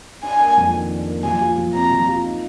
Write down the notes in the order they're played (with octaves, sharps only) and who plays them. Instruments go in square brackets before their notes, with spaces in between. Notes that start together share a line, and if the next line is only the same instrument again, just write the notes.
[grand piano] D4 [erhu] G#5
[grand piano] A#3
F2
D#3
D4
A#3
[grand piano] F3 [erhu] G#5
[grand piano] F4
F3
[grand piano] C4 [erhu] A#5
[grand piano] F3
F4
D#4